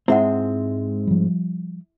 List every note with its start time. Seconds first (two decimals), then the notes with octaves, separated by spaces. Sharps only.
0.08 G#2 G#3 C4 E4 E5 F#5
1.07 F3 G3